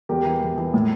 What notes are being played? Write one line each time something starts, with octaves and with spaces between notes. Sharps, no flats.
E2 G4 A#4
E3
E2
E3
A2